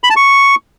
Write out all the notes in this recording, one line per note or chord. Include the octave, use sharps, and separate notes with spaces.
B5
A5
C#6